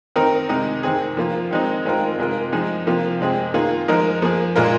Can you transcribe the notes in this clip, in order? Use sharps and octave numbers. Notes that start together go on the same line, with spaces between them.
D#3 C4 D#4 A#4
C3 D#3 G#3 D#4
C3 D#3 C4 G#4
F3 A#3 F4
D#3 G#3 C4 D#4
D#3 G#3 C4 F4 A#4
C3 G#3 F4 A#4
F3 G#3 D#4 G#4
C3 F3 A#3 F4
C3 G#3 C4 G#4
D#3 A#3 F4 G#4
F3 G#3 D#4 A#4
F3 A#3 G#4
A#2 G#3 F4 A#4